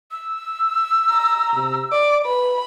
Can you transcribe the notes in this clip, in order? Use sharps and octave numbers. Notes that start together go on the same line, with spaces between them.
E6
A#5
C3
D5 D6
B4 B5